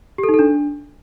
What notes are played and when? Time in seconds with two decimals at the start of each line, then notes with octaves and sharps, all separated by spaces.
0.18 G4
0.23 A4
0.29 D#4
0.34 A4
0.39 D4